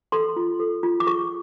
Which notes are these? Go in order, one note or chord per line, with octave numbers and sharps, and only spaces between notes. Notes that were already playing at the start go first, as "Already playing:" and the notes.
A4 C6
F4
A4
F4
D6
G#4 C#6